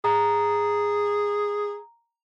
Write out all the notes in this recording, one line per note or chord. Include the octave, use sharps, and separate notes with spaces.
G#4 A#5